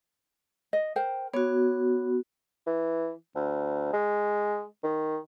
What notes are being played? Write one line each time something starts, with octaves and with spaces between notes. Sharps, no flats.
D#5
A#4 C5 G5
B3 F#4 C#5
E3
D2
G#3
D#3